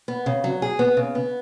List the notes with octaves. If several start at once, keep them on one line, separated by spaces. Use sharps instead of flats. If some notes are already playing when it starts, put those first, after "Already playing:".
B3
C#3
F#3
G#4
B3
C#3
B3